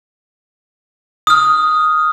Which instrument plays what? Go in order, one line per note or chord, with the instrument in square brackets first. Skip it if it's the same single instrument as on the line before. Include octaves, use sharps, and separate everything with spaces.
[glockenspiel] D#6 F6